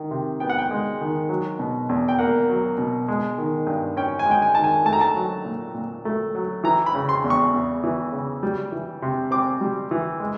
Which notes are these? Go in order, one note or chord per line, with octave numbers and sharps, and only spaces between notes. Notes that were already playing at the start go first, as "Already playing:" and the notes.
Already playing: D#3
C3
B3 G5
F#5
G5
G#3
D#3
F#3
B2
E2
G5
A#3 F#5
F#3
B2
G#3
D#3
G2
C#4 G5
G#5
G#3 G5
G#5
D#3 A5
G#5
A3 A5
A#5
A5
F#3
A#2
A#2
A3
F#3
E3 A#5
B5
C#3
C6
E2
C#6
E2
E3
C#3
G3
E3
C3
C4 D6
G3
E3
G#3